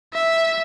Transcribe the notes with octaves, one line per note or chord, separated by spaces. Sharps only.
E5